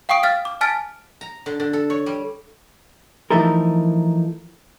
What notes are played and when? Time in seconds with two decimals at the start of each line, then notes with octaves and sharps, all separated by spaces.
0.09 F5 G5 C#6 D#6 D7
0.23 F5 F6 A6
0.45 D6
0.61 G#5 A5 F6 A6 B6 D7
1.21 A#5
1.46 D3
1.60 D3
1.73 A4
1.90 C#5
2.06 G3
3.30 E3 F3 A3 D#4 A4 A#4